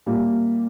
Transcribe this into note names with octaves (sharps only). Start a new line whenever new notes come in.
A#2 G3 A#3